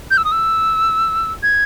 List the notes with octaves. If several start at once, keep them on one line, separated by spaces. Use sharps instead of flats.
G6
E6
D#6
E6
G#6